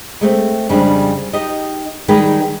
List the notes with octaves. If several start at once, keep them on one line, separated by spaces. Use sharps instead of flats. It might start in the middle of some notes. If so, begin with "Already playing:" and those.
G#3 A3 C4
F2 C#3 G3 G#3 D4
D#4 G4 D#5
D#3 G3 G#3 D#4 G#4 B4